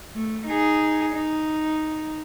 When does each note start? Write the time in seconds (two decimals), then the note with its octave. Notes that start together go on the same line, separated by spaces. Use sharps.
0.15 A3
0.47 D#4 G#4
1.14 D#4